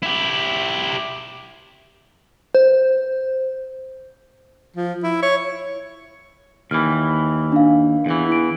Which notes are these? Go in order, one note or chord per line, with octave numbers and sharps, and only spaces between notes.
E4 G4
C5
F3
E4
C#5
D#2 E3 F6
D4 F5
E2 E3
E4 D7